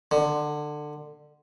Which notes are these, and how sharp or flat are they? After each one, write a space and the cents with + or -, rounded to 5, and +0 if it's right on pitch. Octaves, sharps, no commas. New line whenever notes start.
D3 +20